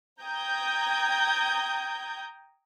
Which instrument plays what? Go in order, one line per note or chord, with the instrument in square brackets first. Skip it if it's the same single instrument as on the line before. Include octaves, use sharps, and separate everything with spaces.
[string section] G5 A#5 D#6 G6 G#6